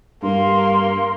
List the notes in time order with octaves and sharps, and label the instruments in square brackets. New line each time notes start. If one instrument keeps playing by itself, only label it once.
[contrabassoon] G2 [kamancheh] A#3 [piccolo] C6